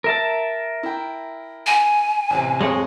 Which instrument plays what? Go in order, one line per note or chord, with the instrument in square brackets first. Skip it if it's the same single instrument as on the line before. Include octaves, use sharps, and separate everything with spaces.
[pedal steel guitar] A#4 E5 A5
[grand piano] E4 G5
[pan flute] G#5
[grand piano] A1 C3
[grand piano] F2 [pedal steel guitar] G#3 G#4 C#5